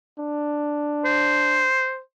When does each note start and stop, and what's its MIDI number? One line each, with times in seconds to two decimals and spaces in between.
0.18 1.68 62
1.05 1.99 72